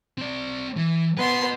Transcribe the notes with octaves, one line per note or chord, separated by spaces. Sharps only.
C4 D5
E3
B3 B4 D#5 C6